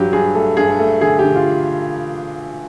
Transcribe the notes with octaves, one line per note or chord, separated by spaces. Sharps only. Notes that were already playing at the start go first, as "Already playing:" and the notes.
Already playing: G2 F#3 G4
G2 G#4
A3 A4
G2 G#4
A4
A3
D3 G#4
G4
D3
F4